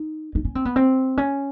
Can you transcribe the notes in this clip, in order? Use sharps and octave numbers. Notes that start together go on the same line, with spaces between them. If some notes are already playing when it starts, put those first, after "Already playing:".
Already playing: D#4
D#4
C#4
C4
B3
C4
C#4